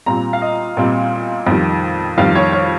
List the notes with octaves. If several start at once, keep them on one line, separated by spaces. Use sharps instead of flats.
A#2 G3 C4 A#5
F5
D#5
A#2 G3 C4
F2 D#3 G3
F2 D#3 G3 F5
C#5
C#5